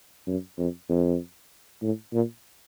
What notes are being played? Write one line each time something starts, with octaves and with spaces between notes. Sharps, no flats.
F#2
F2
F2
A2
A#2